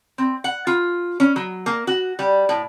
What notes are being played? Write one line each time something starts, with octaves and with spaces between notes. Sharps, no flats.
C4
F#5
F4
C#4
F#3
A#3
F#4
G3
A2